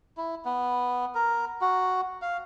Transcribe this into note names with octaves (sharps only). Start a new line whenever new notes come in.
E4
B3
A#4
F#4
F5